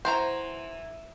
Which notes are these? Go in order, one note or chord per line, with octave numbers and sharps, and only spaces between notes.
E3 F#3 E4 C5 A#5